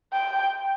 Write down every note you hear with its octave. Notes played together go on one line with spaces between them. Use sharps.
G5